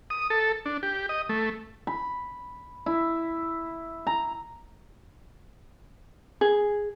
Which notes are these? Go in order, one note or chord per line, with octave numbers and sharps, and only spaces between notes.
D#6
A4
D4
G4
D#5
A3
B5
E4
A#5
G#4